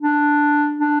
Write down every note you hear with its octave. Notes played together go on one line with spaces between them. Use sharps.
D4
D4